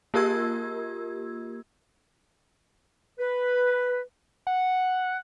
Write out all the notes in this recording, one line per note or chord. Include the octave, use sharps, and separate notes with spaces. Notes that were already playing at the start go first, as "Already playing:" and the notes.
A#3 F4 G4 A#4 E6 G#6
B4
F#5